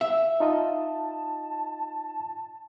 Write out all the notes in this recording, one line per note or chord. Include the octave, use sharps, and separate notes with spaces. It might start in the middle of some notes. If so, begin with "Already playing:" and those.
E5
D#4 F4 D#5 A5